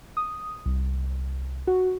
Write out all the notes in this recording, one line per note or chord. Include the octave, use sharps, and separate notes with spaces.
D#6
C2
F#4